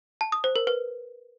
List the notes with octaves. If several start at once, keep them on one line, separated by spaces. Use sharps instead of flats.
A5
D#6
C5
A#4
B4